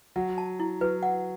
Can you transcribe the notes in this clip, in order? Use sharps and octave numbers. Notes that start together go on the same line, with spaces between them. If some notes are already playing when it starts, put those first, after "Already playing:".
F#3 F#5
A5
E4
F#3 B4
F#5